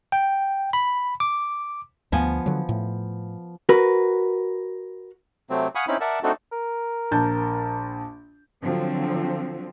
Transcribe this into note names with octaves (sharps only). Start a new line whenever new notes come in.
G5
B5
D6
D2 F3 B3 G#5
D3 F#3
A2
F#4 A#4 B4
C3 F#3 A3 C4
F5 F#5 G#5 B5 C#6 D#6
C4 C#4 D#4 E4 B5
A#4 D5 E5 F#5 A5
A3 C4 D4 D#4 F#4 A4
A#4
A#1 A5 G6
D3 F3 F#3 C4